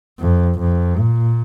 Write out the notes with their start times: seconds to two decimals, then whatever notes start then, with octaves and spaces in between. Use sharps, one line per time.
0.20 F2
0.60 F2
0.99 A#2